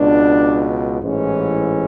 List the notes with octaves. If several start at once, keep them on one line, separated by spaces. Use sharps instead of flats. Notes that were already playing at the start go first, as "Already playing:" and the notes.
Already playing: C#2 B2 D4
A1 G#2 E3 C#4